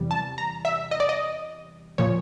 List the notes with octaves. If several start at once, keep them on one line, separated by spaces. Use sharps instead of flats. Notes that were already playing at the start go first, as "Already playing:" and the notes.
Already playing: E2 C3 E3 G3
A5
A#5
E5
D#5
D5
D#5
A#2 F3 C#5